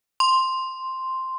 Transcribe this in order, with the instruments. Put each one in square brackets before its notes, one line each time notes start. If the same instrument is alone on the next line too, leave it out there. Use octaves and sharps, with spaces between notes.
[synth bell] C6